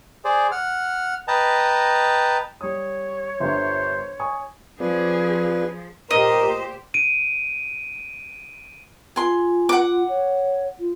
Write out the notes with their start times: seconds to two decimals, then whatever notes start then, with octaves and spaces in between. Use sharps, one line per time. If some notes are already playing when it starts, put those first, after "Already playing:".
0.25 G#4 C5 D5
0.52 F#5 F6
1.28 B4 D#5 G5 A5 A#5
2.61 G3 C#5 D#6
3.40 G1 G3 C5 E5
4.20 G#5 C#6 D#6
4.80 F3 C4 F4 G#4 B4 D5
6.11 A#2 G4 A#4 C5 D#5
6.94 D7 D#7
9.16 F4 G#4 C6
9.69 F#5 D6
10.09 C#5
10.79 F4